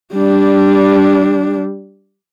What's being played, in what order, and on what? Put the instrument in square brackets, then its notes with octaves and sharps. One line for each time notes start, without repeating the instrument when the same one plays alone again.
[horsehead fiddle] G3 D4